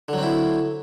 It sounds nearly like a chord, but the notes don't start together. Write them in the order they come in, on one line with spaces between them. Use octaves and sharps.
D3 F#3 C4 E4